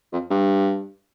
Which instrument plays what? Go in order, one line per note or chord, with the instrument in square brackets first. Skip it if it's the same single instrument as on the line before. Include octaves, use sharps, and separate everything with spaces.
[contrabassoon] F2
G2